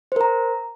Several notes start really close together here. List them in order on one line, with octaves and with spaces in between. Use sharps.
C5 A#4 A#5